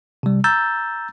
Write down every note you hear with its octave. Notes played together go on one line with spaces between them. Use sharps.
C3 G3
A#5 E6 G6 A6